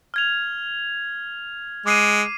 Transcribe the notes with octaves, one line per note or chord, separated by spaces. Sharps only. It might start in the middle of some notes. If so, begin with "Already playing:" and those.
F6 G#6 F7
G#3 D6 C7 D#7